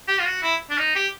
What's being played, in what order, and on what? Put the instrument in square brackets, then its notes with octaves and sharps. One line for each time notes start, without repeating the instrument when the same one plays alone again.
[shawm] G4
F4
F#4
E4
D4
D#4
G4